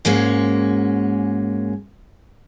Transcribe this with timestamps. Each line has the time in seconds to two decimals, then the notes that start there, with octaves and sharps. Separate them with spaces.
0.05 G#2 G#3 A#3 C#4 F#4